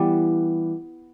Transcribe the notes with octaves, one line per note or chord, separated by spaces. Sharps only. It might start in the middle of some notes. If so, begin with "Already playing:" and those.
Already playing: E3 G3 B3